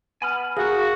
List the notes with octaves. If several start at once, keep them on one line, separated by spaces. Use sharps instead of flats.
B3 G#5 B5 F6
A#3 F#4 G#4